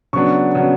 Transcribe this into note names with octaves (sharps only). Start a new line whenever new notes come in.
C#3 F#3 B3 D4 C#6
C#3 F#3 B3 D4